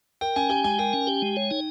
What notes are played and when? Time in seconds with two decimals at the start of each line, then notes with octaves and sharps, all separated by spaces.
0.21 A#4 G5
0.36 C#4 G#5
0.49 G4 G#5
0.64 G#3 G#5
0.79 A#4 G5
0.93 C#4
1.07 G4
1.22 G#3
1.36 C#5
1.51 D#4